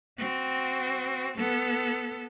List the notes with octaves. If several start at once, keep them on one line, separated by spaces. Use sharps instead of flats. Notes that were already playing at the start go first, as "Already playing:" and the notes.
C4 F#4
B3 A4